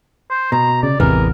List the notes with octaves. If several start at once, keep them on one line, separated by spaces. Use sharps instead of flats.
C5
B2 A#5
C#3 D5
A1 E2 C3 E3 G#3 B3 A#4